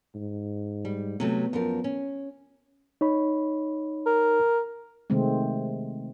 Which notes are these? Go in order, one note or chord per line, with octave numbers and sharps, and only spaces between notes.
G#2
G3
C3 F#3 A3 B3
F#2 F3 A#4
C#4
D#4 C#5 B5
A#4
C3 D#3 G#3 A3 C4